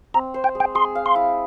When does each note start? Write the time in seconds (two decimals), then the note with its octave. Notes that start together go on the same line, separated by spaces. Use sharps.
0.14 C4 A#5
0.34 C5
0.44 G5
0.55 G#3
0.60 G5
0.75 G#4 C6
0.95 F5
1.06 C6
1.15 E4